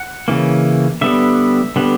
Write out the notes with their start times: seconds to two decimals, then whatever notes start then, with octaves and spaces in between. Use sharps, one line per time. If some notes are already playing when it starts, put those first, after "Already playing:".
Already playing: F#5
0.28 C#3 E3 A#3
1.01 D3 G3 B3 E5
1.76 D3 G3 B3